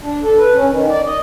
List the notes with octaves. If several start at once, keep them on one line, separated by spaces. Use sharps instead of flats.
D4
A4
B4
C#4
D#3
D5
D#5